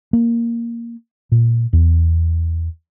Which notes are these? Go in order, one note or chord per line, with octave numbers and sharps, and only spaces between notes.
A#3
A#2
E2